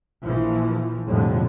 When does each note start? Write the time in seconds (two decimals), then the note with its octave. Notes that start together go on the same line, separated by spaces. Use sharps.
0.24 A#1 E3 F3
1.07 B1 F2 A2 D3 G3 G#3